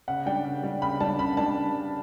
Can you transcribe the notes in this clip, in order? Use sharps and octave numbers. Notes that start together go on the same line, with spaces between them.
C#3 F#5
G3 D4 G5
C#3
G3 D4
C#3 B5
G3 D4 A5
C#3 B5
G3 D4 A5